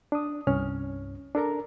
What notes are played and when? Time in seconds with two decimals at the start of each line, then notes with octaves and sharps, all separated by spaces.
0.12 D4 D#6
0.47 C2 G2 C#4 F6
1.35 D4 A4 A#4 A#5